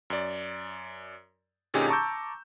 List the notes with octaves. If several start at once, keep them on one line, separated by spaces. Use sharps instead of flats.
F#2 D5
A#2 D3 C#4 D#4 G4 G#4
A5 A#5 C#6 D6 E6 G6